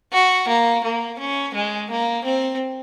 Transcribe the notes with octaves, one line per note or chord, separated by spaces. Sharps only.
F#4
A#3
A#3
C#4
G#3
A#3
C4